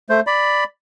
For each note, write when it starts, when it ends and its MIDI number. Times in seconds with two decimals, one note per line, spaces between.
0.10 0.20 57
0.10 0.20 72
0.27 0.64 74
0.27 0.64 83